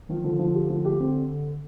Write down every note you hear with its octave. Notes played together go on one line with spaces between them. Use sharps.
D#3 F3
D3 F3
F3
G4
F3
G4
C4